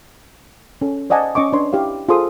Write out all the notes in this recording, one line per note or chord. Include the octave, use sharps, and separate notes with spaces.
C#4 A4
C5 D5 D#5 F#5 G#5 A5
C#4 D#5 C#6 D6
D4 B4 C#5 C6
E4 G4 C#5 F5
F4 G#4 A4 C5 C6 D#6